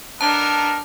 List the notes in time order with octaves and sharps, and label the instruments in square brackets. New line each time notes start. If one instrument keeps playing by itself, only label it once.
[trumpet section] B3 D#4 A#4 [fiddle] D4 [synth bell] A5